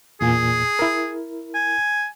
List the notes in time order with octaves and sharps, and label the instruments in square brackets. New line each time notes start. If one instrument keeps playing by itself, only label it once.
[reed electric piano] E2 A#2 G#5 [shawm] G#4
[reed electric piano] E4 A#4
[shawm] G#5